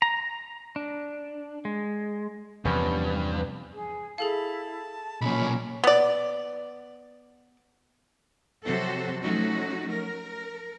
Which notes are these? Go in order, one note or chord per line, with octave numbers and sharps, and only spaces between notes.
A#5
D4
G#3
E2 G2 C3 F3 B3 C#4
G#4
E4 G#4 A4 F5 A5
B1 A#2 C#4 B5
B3 D5
C3 F3 F#3 F#4 A4 C5
F3 F#3 A3 C#4 D#4 F#4
A#4